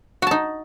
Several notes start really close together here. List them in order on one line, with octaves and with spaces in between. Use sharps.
F#4 A5 D#4